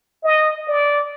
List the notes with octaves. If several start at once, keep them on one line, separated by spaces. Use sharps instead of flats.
D#5
D5